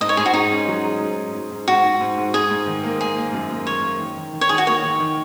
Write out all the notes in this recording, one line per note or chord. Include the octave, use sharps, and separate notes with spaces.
G#2 D#5
C#5
G#2 G#4
F#4
D#4 G#4
C#4
F#3
G#4
G#2
G#4
G#2
G#2
G#2 F#4
G#2
G#2
G#2
G#2 G#4
G#2
D#3
A#3
A#3 G#4
A#3
F#2
A#3
A#3 C#5
A#3
D#3
D#3
D#3
C#5
D#3 G#4
F#4
A#3 C#5
D#3
D#3